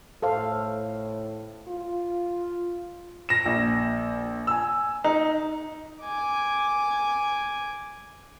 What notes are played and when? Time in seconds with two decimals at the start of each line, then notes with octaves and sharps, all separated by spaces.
0.22 A2 A4 C5 F5
1.68 F4
3.29 A#6 E7
3.46 A#1
4.47 G#5 E6
5.04 D#4
6.02 G#5 D6